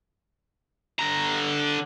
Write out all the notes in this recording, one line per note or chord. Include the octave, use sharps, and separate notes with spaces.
D3 A#5